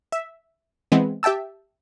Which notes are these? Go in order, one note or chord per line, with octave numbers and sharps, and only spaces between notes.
E5
E3 G#3 B3 C4
G4 E5 G5 A5 E6